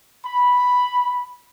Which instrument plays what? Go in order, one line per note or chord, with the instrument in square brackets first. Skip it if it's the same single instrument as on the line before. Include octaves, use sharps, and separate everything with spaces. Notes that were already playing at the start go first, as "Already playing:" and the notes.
[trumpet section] B5